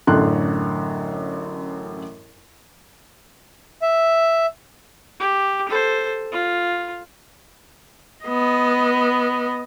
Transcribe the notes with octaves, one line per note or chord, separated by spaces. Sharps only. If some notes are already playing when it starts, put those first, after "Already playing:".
A1 F#2 D3 A4 C6 F#6
E5
G4
A4 C5
F4
B3 D#5